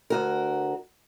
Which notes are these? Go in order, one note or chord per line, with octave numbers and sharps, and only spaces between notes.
D2 F#4 A#4